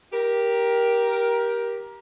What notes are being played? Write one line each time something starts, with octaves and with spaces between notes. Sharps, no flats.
G4 A#4